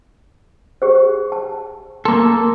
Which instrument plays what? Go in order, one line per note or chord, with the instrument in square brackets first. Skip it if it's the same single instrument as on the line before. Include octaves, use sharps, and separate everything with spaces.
[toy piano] G4 G#4 C5
A5
[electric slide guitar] A#3 A4 [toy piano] C6